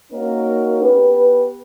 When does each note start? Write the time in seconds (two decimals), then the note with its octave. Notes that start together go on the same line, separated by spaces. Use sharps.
0.12 A#3 C#4 D#4 F#4 A#4
0.82 B3 G4 B4